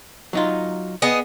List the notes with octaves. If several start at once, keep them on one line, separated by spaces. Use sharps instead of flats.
F#3 D#4 F4
B3 G#4 D#5